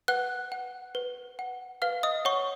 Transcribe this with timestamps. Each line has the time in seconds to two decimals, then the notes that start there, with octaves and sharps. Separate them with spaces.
0.08 B4 F#5 F#6
0.52 F#5
0.95 B4
1.39 F#5
1.82 B4 F5 F6
2.03 D#5 D#6
2.25 C#5 F#5 C#6